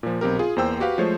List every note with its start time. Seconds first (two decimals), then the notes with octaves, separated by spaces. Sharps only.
0.03 A#2 F3
0.21 B1 C4 G4 A#4
0.39 F4 G#4
0.56 E2 A#3 C5 G5 E6
0.80 F#4 G4 B4 F5
0.98 F3 G#3 A3 C5 C#5